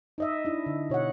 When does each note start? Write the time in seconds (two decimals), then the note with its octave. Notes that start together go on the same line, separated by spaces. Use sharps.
0.18 D#4 D#5 E5
0.45 D4 E4
0.66 D3
0.90 B2 C#5 D#5 F#5